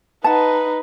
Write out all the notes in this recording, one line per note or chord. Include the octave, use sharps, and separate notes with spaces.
D#4 B4 F#5 A5